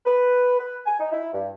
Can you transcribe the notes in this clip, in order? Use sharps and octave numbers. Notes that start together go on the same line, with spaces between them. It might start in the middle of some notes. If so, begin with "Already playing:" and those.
B4
B4
G#5
D#4
E4
G2